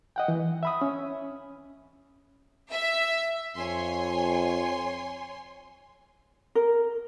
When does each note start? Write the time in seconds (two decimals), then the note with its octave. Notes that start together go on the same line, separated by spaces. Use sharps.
0.16 D#5 F#5 G5
0.28 E3
0.63 E5 B5 D#6
0.81 C#4
2.72 E5
3.57 F2 C#5 G#5 C6
6.55 A#4